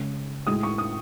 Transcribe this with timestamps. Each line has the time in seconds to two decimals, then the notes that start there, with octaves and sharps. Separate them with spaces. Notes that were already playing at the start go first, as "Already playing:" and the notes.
Already playing: C#3 G#3
0.47 A2 G#3 D#6
0.63 C#6
0.78 D#6